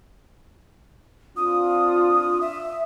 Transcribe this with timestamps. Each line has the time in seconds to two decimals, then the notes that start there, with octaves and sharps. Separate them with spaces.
1.37 C4 D4 F4 D#6
2.41 E5